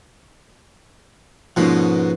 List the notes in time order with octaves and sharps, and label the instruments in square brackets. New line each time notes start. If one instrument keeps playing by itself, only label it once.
[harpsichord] G#2 B2 [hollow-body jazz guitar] F3 A#3 C#4